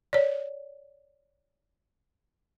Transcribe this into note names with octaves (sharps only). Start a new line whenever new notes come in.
C#5 D5